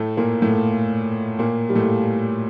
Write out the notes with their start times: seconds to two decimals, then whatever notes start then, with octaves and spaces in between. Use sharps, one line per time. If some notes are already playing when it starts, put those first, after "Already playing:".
Already playing: A2 A3
0.17 A#2 A#3
0.42 A2 A3
1.39 A#2 A#3
1.69 G3
1.75 A2 A3